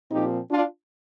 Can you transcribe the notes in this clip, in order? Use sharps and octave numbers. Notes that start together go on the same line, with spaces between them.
A#2 F3 C4 D#4 G4
D4 F4